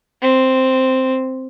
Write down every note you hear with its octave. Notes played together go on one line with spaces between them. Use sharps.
C4